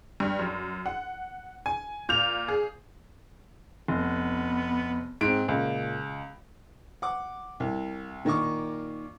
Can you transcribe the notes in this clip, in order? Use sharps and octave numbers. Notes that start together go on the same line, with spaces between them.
G2
F#2
F#5
G#5
A#2 G6 F7
G#4
F1 B3
G#2 C4 D7
C#2 A#2
F#5 D6
C2
A#2 D#3 A#3 A#4 C#6 D6